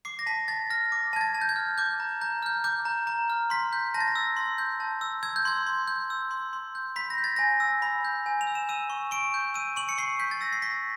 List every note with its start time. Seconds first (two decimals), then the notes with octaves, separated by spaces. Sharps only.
0.05 D6 C7
0.19 A#6
0.26 A5 B6
0.48 A5 A6
0.70 F6 A#6
0.92 D6
1.13 A5 G#6
1.21 A6
1.35 A5
1.41 G6
1.49 G#6
1.56 F6
1.78 D6 G6
2.00 A#5
2.21 A#5 G6
2.43 F6 G6
2.64 D6 G6
2.85 A#5
3.07 A#5
3.30 F6
3.50 C6 B6
3.73 G6
3.94 A5 A#6
4.00 A6
4.08 A#6
4.16 E6
4.37 C6
4.58 G6
4.80 A5
5.01 E6
5.23 E6 G#6
5.36 G6
5.45 C6 G#6
5.66 C6
5.88 G6
6.10 E6
6.31 C6
6.53 C6
6.75 G6
6.96 B5 B6
7.10 A#6
7.18 G6
7.24 A6
7.36 G#5 A#6
7.60 E6
7.82 B5
8.05 G6
8.26 G#5
8.41 F7
8.47 E6
8.55 E7
8.69 E6 D#7
8.90 C#6
9.11 C#6 D7
9.34 G6
9.54 E6 D#7
9.76 C#6 F#7
9.89 C#7
9.98 C#6 C7
10.20 G6 B6
10.31 A6
10.41 E6 A#6
10.53 C7
10.62 C#6 B6